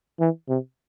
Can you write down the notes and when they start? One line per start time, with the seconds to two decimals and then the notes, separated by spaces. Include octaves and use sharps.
0.20 E3
0.49 C3